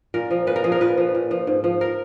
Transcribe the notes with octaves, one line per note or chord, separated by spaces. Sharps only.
A#2 A#4
F3
A#2 B4
A#4
F3 G#4
A#4
A#2 B4
F3
A#2
F3
G#2
F3
A#4